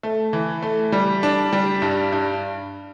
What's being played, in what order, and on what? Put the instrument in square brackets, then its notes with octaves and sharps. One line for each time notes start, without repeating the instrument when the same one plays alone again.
[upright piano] A3
E3
A3
G3
D4
G3
G2
G2